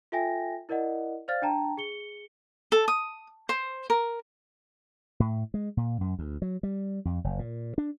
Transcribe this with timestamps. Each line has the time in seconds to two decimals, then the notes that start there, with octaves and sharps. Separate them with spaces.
0.12 F4 A4 E5 G5 G#5 A#6
0.69 E4 A#4 D5 D#5 F#5
1.28 C5 D5 F5 F6 A6
1.42 D4 G5 A5 A#5
1.77 G#4 C#7 G7
2.72 A4
2.88 D#6
3.49 C5
3.90 A#4
5.20 A2
5.54 G#3
5.77 A#2
6.01 F#2
6.19 D2
6.42 F#3
6.63 G3
7.05 F2
7.24 F#1
7.39 A#2
7.78 D4